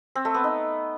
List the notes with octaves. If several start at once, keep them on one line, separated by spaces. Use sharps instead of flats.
C4
A3
B3
D#4